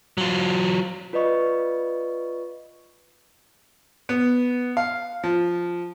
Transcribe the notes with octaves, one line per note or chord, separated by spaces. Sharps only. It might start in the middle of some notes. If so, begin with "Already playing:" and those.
F#3 F4
F4 B4 D5 D#5 C#6
B3
F5
F3